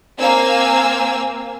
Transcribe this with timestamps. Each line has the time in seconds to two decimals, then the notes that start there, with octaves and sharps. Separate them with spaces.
0.20 A#3 C4 F5 G#5 E6